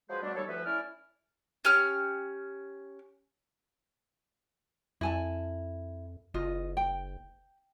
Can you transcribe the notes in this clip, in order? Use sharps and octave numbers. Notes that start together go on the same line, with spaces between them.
F3 F#3 G#3 G#4 B4 C5
B2 F#3 G3 A3 D4
D#2 G3 A4 C#5
D2 E3 F3 B4 E5
A3 C#4 E4 D5 F6
C#4 G4 F6
F2 E4 G#5 A5
F#1 F4 D#5
G5